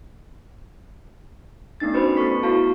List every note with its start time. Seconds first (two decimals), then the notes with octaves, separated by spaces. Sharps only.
1.80 A3 B3 D4 D#4 A6
1.93 C#4 F#4 B4 C5 B5
2.17 A3 B3 A4 C#6 B6
2.43 B3 E4 F#4 F5 A5